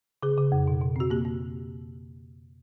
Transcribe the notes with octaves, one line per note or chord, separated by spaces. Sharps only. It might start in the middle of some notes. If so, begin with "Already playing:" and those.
C#3 G#4
C#3
F2
B2
B2
C4 F#4
A#3 G4
A#3